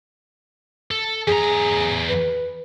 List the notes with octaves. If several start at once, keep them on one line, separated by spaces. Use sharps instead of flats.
A4
E2 G#4 A#5
B4